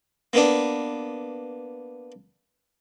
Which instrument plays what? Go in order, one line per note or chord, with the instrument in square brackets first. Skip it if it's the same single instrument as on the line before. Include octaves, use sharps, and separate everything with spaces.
[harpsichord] A#3 B3 D4